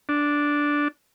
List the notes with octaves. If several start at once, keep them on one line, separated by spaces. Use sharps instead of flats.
D4